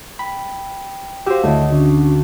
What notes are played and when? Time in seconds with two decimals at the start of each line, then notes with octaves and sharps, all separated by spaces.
0.19 G5 B5
1.26 F#4 G4 C5 F5 E6
1.44 D2 A3 E4 C#5 D#5
1.72 D3 C#4 D4